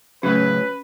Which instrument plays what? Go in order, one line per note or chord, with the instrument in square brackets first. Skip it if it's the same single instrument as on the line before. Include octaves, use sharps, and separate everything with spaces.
[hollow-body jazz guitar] A2 C#3 F#3 [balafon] C#4 [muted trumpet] B4